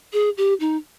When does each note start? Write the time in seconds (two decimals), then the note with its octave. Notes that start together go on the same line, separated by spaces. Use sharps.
0.13 G#4
0.37 G4
0.60 D#4